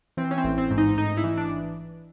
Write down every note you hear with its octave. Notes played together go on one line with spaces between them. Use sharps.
E3 C4
C#4
C4
A1
C4
G#2
D#4
A1 D#4
E4
E3
D4